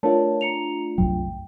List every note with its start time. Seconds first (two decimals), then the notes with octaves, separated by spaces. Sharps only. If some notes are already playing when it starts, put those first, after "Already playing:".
0.03 A3 D4 F4 A#4 C#5 A5
0.41 A#5 C#7 F7
0.98 C2 F#2 F#3 G5